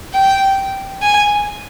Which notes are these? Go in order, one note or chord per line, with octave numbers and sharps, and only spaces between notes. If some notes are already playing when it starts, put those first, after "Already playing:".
G5
G#5